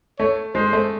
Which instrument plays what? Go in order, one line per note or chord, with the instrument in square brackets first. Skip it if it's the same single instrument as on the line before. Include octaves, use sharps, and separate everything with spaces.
[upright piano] A3 [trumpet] C#5
[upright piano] G#3 [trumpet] C5
[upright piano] A3